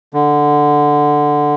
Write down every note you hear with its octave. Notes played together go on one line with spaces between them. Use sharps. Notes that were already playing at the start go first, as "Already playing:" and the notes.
D3